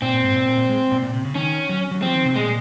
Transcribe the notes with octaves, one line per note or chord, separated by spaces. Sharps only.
A#2 C4
A#2
G#2
A#2
A#2
A#2
G#3
A#2
A#2
C3
C#3
D#3 C#4
F#3
F#3
F3 C4
D#3
C3
A#2 G#3